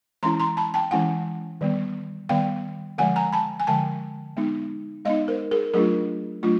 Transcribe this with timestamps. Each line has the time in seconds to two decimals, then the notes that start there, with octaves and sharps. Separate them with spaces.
0.23 E3 G#3 C#4 E4 A#5 C6
0.40 A#5 C6
0.57 A5 B5
0.74 G5 A5
0.91 E3 G#3 C#4 E4 F#5 G#5
1.61 D#3 G3 B3
2.29 D#3 G3 B3 F5 G5
2.98 D3 F3 G#3 F#5 G#5
3.16 G#5 A#5
3.33 A5 B5
3.60 G#5
3.67 D3 F3 G#3 G5 A5
4.37 G#3 B3 D#4
5.05 G#3 B3 D#4 D#5 F5
5.28 A#4 C5
5.51 G#4 A#4
5.74 F#3 A3 D4 F4 G#4 A#4
6.43 F#3 A3 D4 F4